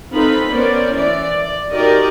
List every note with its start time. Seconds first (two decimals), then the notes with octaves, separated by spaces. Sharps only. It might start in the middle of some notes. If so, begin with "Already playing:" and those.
0.11 C4 D#4 F4 A4 B4 B5
0.51 B3 C#4 A#4 C5 D5
0.93 E3 D5
1.40 D5
1.72 D#4 F#4 G4 A#4 D5 D#5